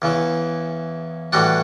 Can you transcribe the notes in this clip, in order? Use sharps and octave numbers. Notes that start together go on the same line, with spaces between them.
E2 C#3 E3
A2 E3 G3 D4 F#4